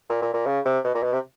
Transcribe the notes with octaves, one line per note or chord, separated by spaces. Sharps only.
A#2
A#2
A#2
C#3
C3
B2
A#2
B2
C3